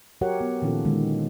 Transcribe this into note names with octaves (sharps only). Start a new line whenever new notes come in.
F#3 F#4 G4 A#4 C#5 F#5
B3
A#2 D#3 F3 C#4 F4 A4
D3 D#3 G#3